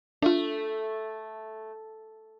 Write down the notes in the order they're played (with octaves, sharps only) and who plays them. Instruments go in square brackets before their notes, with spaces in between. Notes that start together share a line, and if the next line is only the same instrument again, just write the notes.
[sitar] A3 [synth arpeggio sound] D4 F4